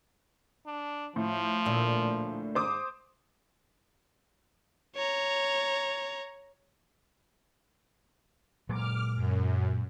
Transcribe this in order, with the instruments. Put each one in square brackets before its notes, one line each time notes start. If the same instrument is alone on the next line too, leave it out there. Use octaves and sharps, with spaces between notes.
[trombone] D4
[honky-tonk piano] A2 [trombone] F3
[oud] D2 A#2
[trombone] G#2 [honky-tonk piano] C5 D6 D#6
[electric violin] C#5 A#5
[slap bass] A#2 F#3 G#3 [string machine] D6 F6
[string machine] F#2